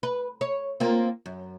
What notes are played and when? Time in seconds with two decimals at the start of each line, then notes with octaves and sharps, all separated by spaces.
0.03 B4
0.41 C#5
0.80 A#3 C4 F4
1.26 F#2